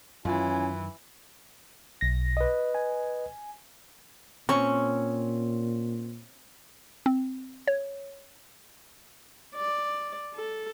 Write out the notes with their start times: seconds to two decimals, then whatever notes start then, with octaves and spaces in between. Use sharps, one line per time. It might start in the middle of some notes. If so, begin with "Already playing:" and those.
0.25 F#2 D#3 E3 C#4 E4 F4 G#5
2.01 B1 A#6
2.37 B4 D#5
2.75 G#5
4.49 A#2 C4 C#4 C#6
7.06 C4
7.68 C#5
9.56 D5
10.34 A4